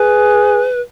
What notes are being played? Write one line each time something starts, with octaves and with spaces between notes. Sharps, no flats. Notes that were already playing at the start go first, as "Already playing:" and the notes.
Already playing: G#4 B4